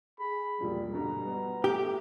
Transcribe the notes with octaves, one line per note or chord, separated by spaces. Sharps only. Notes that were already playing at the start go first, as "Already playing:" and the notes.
G#4 B5
E1 A#2 F3 G3
G2 B2 D3 G3 A#5
B3
A3 G4 G7